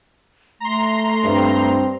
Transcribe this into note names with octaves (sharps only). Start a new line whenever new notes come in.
A3 A#5 C6
G2 C4